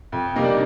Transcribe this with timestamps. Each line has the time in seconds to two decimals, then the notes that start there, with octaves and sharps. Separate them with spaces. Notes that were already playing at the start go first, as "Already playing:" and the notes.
0.12 F2
0.36 C3 G3 A#3 D#4
0.43 D4 D5